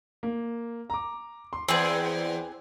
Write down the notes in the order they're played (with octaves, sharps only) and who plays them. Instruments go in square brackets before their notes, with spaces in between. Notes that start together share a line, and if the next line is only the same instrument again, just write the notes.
[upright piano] A#3
A#5 D6
C6
[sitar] E2 [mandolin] C4 G#4 [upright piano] B4